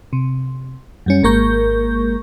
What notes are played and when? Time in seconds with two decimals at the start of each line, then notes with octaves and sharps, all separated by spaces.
0.13 C3
1.06 F#2 G3 C#4
1.23 G#1 G#3 A#3 A#4 C#6 G6